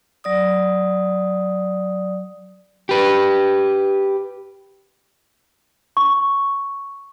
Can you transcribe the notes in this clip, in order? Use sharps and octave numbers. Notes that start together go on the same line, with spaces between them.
F#3 D5 D#6
G4 B4
C#6